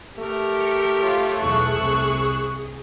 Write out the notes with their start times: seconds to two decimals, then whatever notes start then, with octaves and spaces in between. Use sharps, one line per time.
0.19 A3 G4 A#4
0.60 C#7
1.01 F4 C#5
1.39 B1 E2 G#4 C#6 E6 F#6
1.78 C2